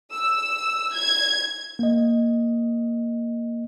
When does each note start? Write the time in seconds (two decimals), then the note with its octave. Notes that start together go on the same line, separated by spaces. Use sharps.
0.12 E6
0.93 G#6
1.79 A#3 D#5